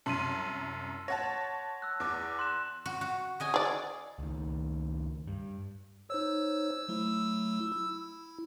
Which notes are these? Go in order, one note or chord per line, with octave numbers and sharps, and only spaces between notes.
C2 F#2 A5 C6 D#7
C#5 F#5 A5 A#6
E6 F#6
E2 D6
C6 F#6 E7
F#4
F#4
F#4 D#5 G#5
G#4 D5
C#2 D#3
G2
D#4 C5 C#5 E6
F#3 A3 E4
E4